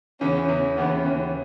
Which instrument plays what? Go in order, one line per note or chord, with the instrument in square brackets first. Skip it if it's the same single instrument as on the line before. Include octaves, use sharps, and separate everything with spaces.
[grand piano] E2 C#3 E3 [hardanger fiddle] C#4
[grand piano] E2 C#3 E3
[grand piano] D#2 C#3 E3 [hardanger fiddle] B3
[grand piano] D#2 C#3 E3 [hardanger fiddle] C#4